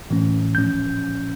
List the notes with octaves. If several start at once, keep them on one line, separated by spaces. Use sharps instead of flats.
A2 E3 A3 C#4
A#2 F3 C#4 G6